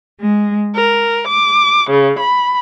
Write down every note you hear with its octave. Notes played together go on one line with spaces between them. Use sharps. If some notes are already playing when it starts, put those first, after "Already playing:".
G#3
A#4
D6
C#3
B5